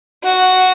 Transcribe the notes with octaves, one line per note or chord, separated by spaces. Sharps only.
F#4